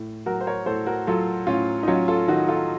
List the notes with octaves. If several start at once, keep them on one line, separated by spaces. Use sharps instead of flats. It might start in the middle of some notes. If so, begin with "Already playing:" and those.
Already playing: A2
F#3 F#4 A#4
C5
A#4 C#5
A2 A4 C5
F#4 A#4
F#3 F4 A4
A2 C#4 F4
D#4
F#3 C#4 F4
F4 A4
D#3 D#4 F#4
F4 A4